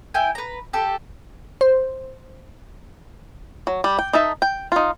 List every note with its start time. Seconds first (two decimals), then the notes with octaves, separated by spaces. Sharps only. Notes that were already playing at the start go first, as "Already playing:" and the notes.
0.14 E4 G5 G#5
0.35 B4 A#5
0.73 G4 A4
1.61 C5
3.67 F#3
3.84 G3
3.99 G5
4.13 D#4 A4 E5
4.42 G5
4.72 D#4 F4